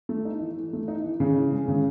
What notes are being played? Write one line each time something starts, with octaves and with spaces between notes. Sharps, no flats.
A3
D#4
E3
E3
A3
D#4
E3
C#3
E3
G#3
C#3